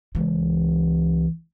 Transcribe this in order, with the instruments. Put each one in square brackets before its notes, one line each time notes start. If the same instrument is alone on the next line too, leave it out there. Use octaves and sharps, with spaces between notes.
[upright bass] C#2 E3